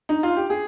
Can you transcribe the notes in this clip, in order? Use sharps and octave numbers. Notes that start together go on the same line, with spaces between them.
D#4
F4
G4
G#4